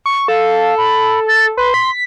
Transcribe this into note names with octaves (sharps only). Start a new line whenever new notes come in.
C#6
A4 F5
B5
A6
B4 C6
B6